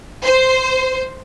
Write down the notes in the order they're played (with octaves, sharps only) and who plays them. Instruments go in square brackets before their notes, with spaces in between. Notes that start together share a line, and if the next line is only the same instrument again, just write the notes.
[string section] C5